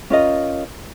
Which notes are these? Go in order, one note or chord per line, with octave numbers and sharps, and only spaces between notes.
C#4 F4 A#4 D#5